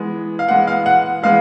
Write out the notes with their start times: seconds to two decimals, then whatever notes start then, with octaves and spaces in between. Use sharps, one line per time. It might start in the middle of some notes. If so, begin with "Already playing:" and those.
Already playing: E3 G#3 B3
0.39 F5
0.48 E3 G#3 B3 F#5
0.67 F5
0.86 F#5
1.23 E3 G#3 B3 F5